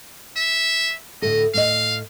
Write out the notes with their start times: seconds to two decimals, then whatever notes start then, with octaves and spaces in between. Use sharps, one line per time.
0.37 E5
1.22 D2 A2 A4 D#5
1.54 A2 D#5 F5